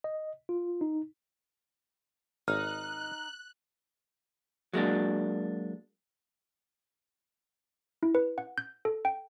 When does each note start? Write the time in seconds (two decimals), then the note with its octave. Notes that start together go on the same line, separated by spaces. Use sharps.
0.04 D#5
0.49 F4
0.81 D#4
2.48 G#1 D#4 F6 F#6
4.73 F#3 G#3 A#3 D4
8.03 E4
8.15 B4
8.38 F#5
8.58 G6
8.85 A4
9.05 G5